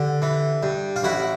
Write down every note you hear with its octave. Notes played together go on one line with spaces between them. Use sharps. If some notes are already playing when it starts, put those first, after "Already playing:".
Already playing: D3 G4
E3
G2
F4
A1 E4 F#4